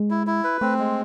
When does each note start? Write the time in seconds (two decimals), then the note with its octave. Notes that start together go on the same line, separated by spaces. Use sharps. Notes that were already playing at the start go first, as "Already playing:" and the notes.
Already playing: G#3
0.10 E4
0.27 E4
0.44 B4
0.61 A3 C4
0.79 G#3